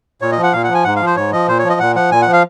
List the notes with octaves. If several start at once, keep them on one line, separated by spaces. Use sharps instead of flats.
A#2 C#5
D#5
F3
F#5
A#2 F5
F#5
F3
G#5
G#2 F#5
F5
F3
C5
G#2 C#5
F3 D#5
A#2 C5
C#5
F3
D#5
A#2 F#5
F3 F#5
A#2 G#5
F#5
F3
F5